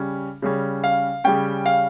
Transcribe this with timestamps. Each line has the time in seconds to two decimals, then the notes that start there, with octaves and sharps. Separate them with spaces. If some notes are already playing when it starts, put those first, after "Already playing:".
Already playing: C#3 G3 C#4
0.42 C#3 G3 C#4
0.84 F5
1.24 C#3 G3 C#4 G5
1.66 F5